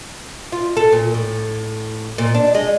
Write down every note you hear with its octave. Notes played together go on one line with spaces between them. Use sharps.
F4
A4
A#2
A2
A#2
D4
G#3